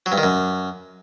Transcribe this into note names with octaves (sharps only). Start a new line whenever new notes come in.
F#3
G2
D#3
F#2